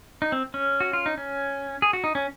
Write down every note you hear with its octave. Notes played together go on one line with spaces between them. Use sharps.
D#4
C4
C#4
F#4
F4
D#4
C#4
G#4
F#4
D#4
C#4